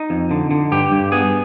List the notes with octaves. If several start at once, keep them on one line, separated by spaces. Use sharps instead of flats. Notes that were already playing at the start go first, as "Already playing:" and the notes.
Already playing: D#4
F2
D3
D3
G2 G4
G2
B3 G#4